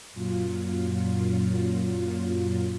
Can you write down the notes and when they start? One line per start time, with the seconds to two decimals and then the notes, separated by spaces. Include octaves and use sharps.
0.13 F#2 A#2 F#3 F4